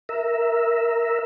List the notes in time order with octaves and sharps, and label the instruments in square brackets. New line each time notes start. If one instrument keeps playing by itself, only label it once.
[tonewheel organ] A#4 E5